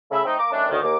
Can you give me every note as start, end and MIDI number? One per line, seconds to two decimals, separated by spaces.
0.11 0.22 49
0.11 0.22 57
0.11 0.22 76
0.11 0.22 83
0.25 0.35 57
0.25 0.35 60
0.25 0.35 63
0.38 0.51 58
0.38 0.51 82
0.38 0.51 86
0.52 0.69 51
0.52 0.69 55
0.52 0.69 57
0.52 0.69 61
0.52 0.69 62
0.69 0.77 38
0.69 0.77 45
0.69 0.77 51
0.82 0.96 39
0.82 0.96 58
0.82 0.96 86